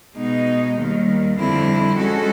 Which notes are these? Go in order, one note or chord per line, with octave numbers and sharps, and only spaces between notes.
B2 G#3 B3 D#4
D#2 D#3 G3
F2 D3 G3 C4 E4
G#3 C#4 F#4 A4